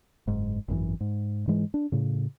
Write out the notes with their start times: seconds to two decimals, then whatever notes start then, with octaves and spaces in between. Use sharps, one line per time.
0.28 F#1 G#2
0.68 G#1 F#2 C#3 E3
1.01 G#2
1.47 G#2 E3 G#3
1.74 D4
1.92 A2 C#3